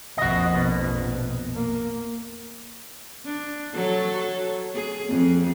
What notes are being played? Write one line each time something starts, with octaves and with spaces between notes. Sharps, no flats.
A#1 F2 F#4 D#5
B2
A#3
D4
F#3 A4 C#5
G#4
F2